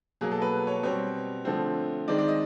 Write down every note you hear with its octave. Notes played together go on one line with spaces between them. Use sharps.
B2 F#3 A#3 G#4
A4
B4
C#5
B2 G3 C4 C#5
D3 F3 A3 C4
D#3 G#3 C4 D5
D5
D#5